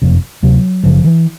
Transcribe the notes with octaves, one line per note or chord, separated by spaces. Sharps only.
F#1 F2 C3
D2 C3 F#3
F#1 F#2 C#3 F3
E3